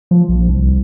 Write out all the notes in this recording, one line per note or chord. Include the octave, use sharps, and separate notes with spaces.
F3
A#1
C2